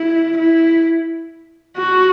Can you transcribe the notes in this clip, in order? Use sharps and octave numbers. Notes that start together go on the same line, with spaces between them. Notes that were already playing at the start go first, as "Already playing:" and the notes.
Already playing: E4
E4
F#4